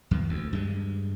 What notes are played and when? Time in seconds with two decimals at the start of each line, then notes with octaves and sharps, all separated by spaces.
0.11 E2 D#3
0.29 D2
0.53 G2 G#3